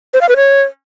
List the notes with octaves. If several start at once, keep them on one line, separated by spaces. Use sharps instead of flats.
C5
F5
B4
C#5